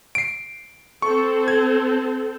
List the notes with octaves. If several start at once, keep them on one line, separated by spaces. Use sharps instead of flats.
C7 D7
C4 A4 C#6
G#6